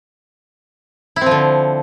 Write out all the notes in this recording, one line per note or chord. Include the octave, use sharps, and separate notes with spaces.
D3 F3 C4 E4